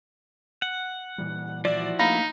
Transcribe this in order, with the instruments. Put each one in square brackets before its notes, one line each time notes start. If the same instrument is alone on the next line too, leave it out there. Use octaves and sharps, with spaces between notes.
[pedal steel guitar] F#5
[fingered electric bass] A#2 E3 G3
[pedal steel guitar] F3 E4 F#4 [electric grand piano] D5
[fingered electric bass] A3 A#3 D4 [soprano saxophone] D#4 [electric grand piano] F5 B5 A#6